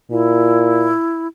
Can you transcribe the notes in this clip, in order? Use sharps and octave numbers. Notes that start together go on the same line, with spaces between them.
A#2 E4